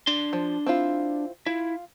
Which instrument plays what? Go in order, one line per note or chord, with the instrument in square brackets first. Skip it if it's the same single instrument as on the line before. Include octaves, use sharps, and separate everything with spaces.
[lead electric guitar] D4 C6
[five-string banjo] F3
C4 E4 F4
[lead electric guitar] E4 [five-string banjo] F4